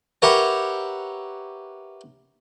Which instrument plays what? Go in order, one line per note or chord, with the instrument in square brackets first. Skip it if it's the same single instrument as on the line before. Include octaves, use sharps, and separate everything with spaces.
[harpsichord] G4 A#4 B4 C#5 E5 F#5